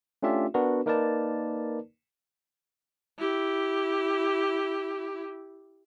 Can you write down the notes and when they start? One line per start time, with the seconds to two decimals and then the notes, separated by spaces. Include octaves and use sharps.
0.23 A3 C#4 D4 F4 G4 E5
0.54 B3 D4 F#4 A#4 B4
0.86 A#3 D#4 A#4 B4 D5 A5
3.18 E4 G4